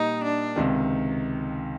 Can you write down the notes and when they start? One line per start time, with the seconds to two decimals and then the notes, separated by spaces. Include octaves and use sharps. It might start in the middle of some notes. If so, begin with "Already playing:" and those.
Already playing: A#2 G3 A#3 D#4
0.24 D4
0.56 C#2 C3 D#3